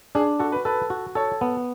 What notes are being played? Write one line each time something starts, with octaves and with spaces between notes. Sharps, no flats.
D4 G#4
F#4 A4
B4
A4 B4
F#4
A4 C#5
B3